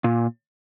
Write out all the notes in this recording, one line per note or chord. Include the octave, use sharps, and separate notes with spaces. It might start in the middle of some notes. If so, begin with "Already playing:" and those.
A#2